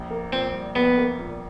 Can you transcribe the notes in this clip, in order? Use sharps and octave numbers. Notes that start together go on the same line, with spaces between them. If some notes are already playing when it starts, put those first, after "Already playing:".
Already playing: A#1
A#3
A#2 C4
G3
A#1 B3
A#3
A#2